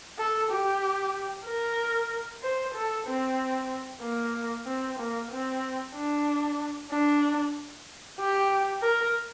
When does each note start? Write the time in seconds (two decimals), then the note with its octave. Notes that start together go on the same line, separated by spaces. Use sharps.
0.19 A4
0.51 G4
1.47 A#4
2.43 C5
2.74 A4
3.07 C4
4.02 A#3
4.67 C4
4.99 A#3
5.31 C4
5.95 D4
6.91 D4
8.19 G4
8.82 A#4